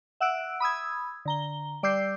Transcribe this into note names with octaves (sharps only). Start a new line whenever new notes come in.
E5 F#5 E6 F#6 D7
B5 D#6 E6 G#6
D3 A#5 G7
G3 D5 D6 E6 G6 C7